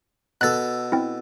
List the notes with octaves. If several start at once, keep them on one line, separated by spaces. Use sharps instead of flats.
B2 A4 F#6 A6
C4 E4